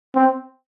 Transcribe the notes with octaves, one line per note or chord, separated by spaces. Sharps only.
C4